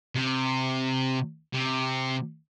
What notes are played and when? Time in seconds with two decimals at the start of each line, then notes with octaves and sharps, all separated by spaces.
0.15 C3
1.53 C3